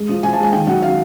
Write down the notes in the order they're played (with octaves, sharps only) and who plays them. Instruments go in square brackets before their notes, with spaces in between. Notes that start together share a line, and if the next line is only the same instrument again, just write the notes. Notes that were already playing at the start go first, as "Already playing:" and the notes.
Already playing: [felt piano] G#3
F3
F3 G#5
A5
G#3 G#5
D#3 G5
F#3 F#5
F5